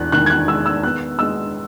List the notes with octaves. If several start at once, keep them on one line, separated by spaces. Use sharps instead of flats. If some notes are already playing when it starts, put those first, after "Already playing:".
Already playing: E2 F#6
D#3 F#6
G#6
F#6
G#3 E6
E6
B3 F#6
G#3 E6